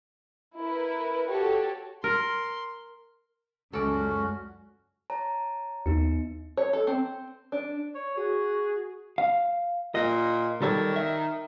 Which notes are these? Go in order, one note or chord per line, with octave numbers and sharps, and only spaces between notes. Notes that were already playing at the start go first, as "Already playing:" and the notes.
E4 A#4 B4
F#4 G4 A4 C#5
A#4 C6
C#2 F#2 C#4 F#4 A4 D5
C#5 A5 A#5
D#2 B3 D#4 C#7
C#5
A4
C4
D4
C#5
F#4 G#4
F5
A#2 D#5
D#3 G3 A4 C#5
E5